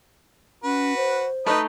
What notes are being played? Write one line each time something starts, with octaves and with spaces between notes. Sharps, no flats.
C#4 F#4 B4
C5
A3 D#4 B4 D#5